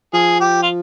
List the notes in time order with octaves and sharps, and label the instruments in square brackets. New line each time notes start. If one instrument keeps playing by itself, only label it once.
[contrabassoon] F3 [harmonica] G#4
[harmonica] G4
F4